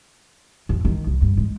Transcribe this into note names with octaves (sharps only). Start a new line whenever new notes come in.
F2
D#3
C2
G2
G#3